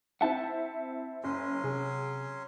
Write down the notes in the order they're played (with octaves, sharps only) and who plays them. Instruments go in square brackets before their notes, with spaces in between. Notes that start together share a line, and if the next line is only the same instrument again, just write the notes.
[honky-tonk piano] C4 E4 E5 [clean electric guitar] F#5 A5
[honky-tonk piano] F#1 [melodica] F#3 C#4 C6
[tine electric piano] C3 [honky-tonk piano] G#4